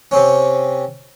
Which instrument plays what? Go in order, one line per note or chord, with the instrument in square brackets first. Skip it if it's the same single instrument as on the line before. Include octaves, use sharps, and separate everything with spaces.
[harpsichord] C3 C4 C#4